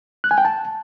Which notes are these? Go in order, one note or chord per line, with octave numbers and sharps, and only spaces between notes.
F#6
G#5
G5
A5